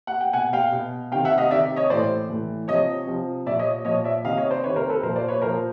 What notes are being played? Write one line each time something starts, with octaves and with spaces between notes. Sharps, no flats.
F#5
G5
B2 F#5 G#5
F5 G5
B2
C3 D#3 F5 G5
E5 F#5
D#5 F5
C3 D#3 D5 E5
C#5 D#5
A2 E3 C5 D5
A2 E3
C3 F3 C#5 D#5
C3 F3
A#2 F3 D5 E5
C#5 D#5
A#2 F3 C#5 D#5
D5 E5
C3 D#3 D#5 F5
C#5 D#5
C5 D5
C3 D#3 B4 C#5
A#4 C5
A4 B4
A#2 F3 A#4 C5
C5 D5
B4 C#5
A#2 F3 A#4 C5